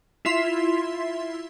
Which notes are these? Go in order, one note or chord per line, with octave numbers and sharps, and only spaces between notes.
E4 F4 E5 C6